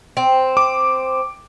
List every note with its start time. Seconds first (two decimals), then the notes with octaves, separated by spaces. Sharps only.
0.17 C4
0.57 D6